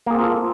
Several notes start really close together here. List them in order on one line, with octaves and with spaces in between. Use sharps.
A#3 G#4 C4 F4 A4